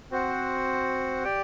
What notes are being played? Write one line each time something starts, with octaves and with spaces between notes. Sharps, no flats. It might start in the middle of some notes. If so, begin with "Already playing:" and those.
C4 F#4 C5 F#5
G4 D5 G5